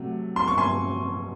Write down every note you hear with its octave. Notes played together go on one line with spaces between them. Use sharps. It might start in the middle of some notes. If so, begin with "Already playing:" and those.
Already playing: C3 F#3 A3
C6
C#6
G#5 C6